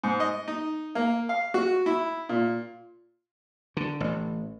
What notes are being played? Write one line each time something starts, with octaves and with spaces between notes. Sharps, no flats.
G#2
D#5
D#4
A#3
F5
F#4
E4
A#2
D3
A1